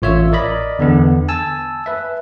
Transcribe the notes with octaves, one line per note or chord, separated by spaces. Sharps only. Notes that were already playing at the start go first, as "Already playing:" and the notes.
A1 F4 C#5 E5 E6
A#4 D5 D#5 B5
E2 D3 B3
G#5 A5 E6
B4 E5